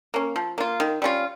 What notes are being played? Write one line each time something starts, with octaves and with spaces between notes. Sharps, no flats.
A#3 C#4
F3
A#3 F4
D#3
G3 C#4 F4